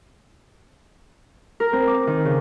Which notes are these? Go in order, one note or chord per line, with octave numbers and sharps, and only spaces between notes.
A#4
C4
D6
D#3
C#3